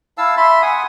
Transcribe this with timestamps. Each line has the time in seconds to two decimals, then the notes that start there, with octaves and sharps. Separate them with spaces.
0.18 E4 F5 A5 E6
0.37 E5 B5 C6
0.62 F#5 G#5 D#6